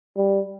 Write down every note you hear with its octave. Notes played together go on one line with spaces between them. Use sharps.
G3